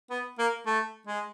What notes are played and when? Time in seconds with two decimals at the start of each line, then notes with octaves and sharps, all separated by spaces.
0.10 B3
0.39 A#3
0.66 A3
1.07 G#3